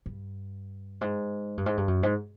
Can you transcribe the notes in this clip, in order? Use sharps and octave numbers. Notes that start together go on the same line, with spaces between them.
G2
G#2
G2
G#2
G2
F#2
G#2